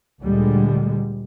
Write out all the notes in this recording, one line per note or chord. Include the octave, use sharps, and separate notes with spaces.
D2 A#2 D3 G3 G#3